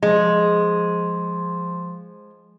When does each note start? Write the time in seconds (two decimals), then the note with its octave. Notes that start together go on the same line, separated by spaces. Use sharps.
0.03 F3 G#3